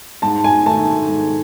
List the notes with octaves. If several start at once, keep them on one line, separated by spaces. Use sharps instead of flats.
G#2 A5
G#5
D#3 A3 A5
G#2